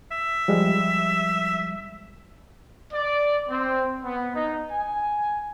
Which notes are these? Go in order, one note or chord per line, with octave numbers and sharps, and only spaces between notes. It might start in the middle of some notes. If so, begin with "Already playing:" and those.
E5
F3 G3 G#3
D5
C4
B3
D#4
G#5